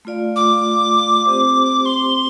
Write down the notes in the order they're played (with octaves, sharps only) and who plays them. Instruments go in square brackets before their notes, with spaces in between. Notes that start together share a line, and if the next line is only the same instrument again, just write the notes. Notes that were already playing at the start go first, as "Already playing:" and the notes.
[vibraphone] A3 F4 D5 F5
[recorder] D6
[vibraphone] C4 G4 C5
[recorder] C6